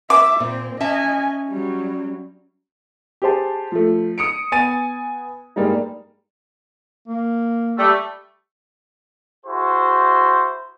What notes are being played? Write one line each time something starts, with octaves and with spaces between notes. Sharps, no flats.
E5 D6
A#2 C4
C#4 D#5 E5 G#5 A5
F#3 G3
G4 G#4 C5 A5
F3 A3
D#6 C#7 D7
B3 G#5 A6 D#7
G2 G3 G#3 A#3 D#4
A#3
G3 A3
E4 F#4 G#4 C5